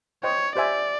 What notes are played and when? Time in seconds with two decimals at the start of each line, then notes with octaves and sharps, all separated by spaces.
0.23 C5 C#5 D#5 G5
0.56 G4 C5 D5 E5 G#5